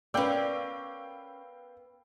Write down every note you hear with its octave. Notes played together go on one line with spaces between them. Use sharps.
B3 C#4 A#4 B4 D5 F5 G5 E6